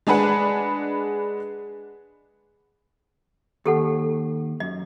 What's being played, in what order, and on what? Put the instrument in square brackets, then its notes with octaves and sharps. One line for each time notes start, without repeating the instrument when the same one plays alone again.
[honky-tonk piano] G#3 D4 G#4 B4 F#5
[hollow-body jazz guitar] D#2 [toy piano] G4 A4 F#5
[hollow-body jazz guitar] F#2 [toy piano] D#5